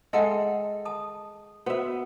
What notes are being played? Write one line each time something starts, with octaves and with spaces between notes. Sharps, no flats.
G#3 A4 E5 F#5 G5
A5 D#6
B3 F#4 C5 E5